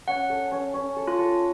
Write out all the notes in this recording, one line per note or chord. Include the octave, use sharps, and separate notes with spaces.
C#4 F#5
A4
C#4
C#4
A4
F4
A4